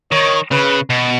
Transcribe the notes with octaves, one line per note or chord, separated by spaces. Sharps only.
D#3 C#5
C#3 B4
B2